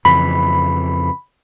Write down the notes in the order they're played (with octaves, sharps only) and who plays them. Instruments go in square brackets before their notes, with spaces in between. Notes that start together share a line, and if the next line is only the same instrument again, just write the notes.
[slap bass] F2 C#3 E3 [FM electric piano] B5